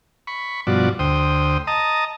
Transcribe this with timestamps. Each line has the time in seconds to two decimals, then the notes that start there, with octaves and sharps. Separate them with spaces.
0.27 B5 C#6
0.67 G2 B2 F3 F#4 D5
0.99 D2 C5 G5 D#6
1.67 D#5 A5 A#5 D#6